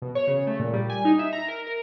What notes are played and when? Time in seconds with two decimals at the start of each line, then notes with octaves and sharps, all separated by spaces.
0.02 B2
0.15 C#5
0.27 C#3
0.47 A3
0.60 A#2
0.73 G3
0.90 G#5
1.05 D#4
1.19 E5
1.33 A#5
1.48 A#4
1.67 A#4